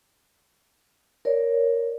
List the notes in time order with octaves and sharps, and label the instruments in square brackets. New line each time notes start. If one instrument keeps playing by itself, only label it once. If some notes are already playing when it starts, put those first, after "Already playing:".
[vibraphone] A#4 C#5 D5